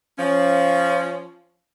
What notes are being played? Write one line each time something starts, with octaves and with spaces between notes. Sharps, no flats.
F3 C#4